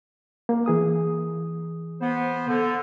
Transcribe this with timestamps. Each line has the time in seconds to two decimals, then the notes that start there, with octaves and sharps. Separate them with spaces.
0.49 A#3
0.66 E3 G#4 D#6
2.01 B3 C5
2.48 D3